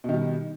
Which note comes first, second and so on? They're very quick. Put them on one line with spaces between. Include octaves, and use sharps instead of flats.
B2 D#3 G3